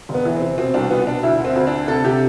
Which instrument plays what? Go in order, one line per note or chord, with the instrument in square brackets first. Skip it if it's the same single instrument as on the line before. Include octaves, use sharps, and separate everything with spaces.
[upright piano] E1
B3
E3
C4
C3
B2 C4
C2 D4
B2 B3
B2 D4
D2 E4
D3 C4
D2
D3 D4
C3 A4
C3 G4